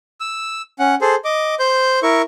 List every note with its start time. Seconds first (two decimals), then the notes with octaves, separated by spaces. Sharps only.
0.20 E6
0.79 C#4 F#5
1.01 G#4 A4 C5
1.24 D#5 D6
1.59 C5 G6
2.03 E4 A#4 C#6